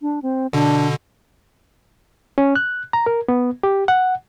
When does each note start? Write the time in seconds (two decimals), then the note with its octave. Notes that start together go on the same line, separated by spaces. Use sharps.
0.02 D4
0.22 C4
0.53 B2 D3 D4
2.38 C#4
2.56 F#6
2.93 A#5
3.06 A#4
3.28 B3
3.63 G4
3.88 F#5